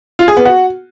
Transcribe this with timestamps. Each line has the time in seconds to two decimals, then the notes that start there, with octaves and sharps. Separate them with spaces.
0.19 F4
0.28 G#4
0.37 B3
0.45 F#4